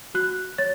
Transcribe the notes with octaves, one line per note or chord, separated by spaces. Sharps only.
F#4 F#6
C#5 A6